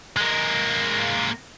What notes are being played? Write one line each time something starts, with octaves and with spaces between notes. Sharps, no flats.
G#3 A#3